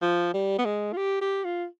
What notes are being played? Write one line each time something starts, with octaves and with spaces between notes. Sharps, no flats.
F3
G3
B3
G#3
F4
G4
G4
F4